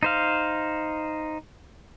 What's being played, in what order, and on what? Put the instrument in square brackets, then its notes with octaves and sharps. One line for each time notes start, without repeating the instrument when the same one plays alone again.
[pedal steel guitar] D#4 C5 F5